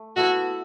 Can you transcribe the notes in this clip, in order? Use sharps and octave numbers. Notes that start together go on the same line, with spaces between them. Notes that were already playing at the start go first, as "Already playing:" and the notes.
Already playing: A3
B3 E4 F#4 A4 E5